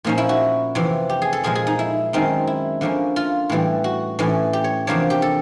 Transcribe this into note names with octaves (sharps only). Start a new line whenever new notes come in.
A#2 F3 A#3 C#4 D#4
E4
F#4
F2 C3 E3
G4
G#4
A4
A#2 F3 G#3 G#4
G#4
D#4
E4
F#2 D#3 G#3 C4 D#4
E4
D3 F3 A#3 C#4
F4
A2 E3 G3
F#4
A2 E3 A3 C#4
G4
C#5
E2 C3 F3 A#3 D4 C#5
G4
A4